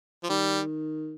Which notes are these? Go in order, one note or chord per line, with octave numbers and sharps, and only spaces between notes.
F3
D#3 G3